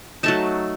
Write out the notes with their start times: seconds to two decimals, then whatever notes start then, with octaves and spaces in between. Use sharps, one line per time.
0.23 F#3 A3 D#4 A5